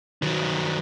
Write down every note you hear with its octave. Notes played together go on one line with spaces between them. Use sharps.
D#3 F#3